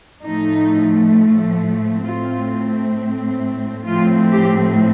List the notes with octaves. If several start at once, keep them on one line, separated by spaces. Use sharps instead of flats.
A2 F3 A3 D#4
A2 A3 C4 F4
A2 F3 C4 F4
G4